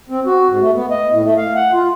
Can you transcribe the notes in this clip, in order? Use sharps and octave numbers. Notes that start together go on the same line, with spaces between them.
C4
F#4
G#2
A3
B3
D#5
A2
A3
F5
F#5
F4